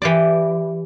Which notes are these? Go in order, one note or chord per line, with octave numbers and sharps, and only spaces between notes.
E3 G4 D5